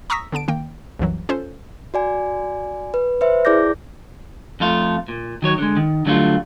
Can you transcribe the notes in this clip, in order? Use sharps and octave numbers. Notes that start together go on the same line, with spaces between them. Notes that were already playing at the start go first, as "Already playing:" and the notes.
A#5 C#6 D#6 E6 A#6 B6
D3 B3 A5 D7
D#3 A#3 G5
C2 F#2 E3 F#3
C#4 F4 A4 C5
F#4 D5 G#5
B4
B4 C5 E5
E4 G#4 D5 D6 G6 A#6
F2 A3 F4
A#2
D#3 F#3 C#5
D3 G#3
D#3
D3 F#3 G3 A3 F4